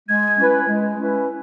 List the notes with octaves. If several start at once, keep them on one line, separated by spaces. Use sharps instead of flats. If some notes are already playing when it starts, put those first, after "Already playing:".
G#3 G#6
C#4 E4 B4
G#3
C#4 E4 B4